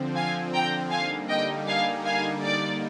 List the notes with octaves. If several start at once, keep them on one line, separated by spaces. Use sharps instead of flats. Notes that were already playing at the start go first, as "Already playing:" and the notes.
Already playing: D3 F3 C4
F5 G#5
G5 A#5
D3 G3 A#3 D#4 F5 G#5
D#5 G5
F5 G#5
F5 G#5
D3 G3 A#3 D#4 D5